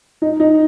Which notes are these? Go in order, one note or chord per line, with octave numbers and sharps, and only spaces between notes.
D#4
D#4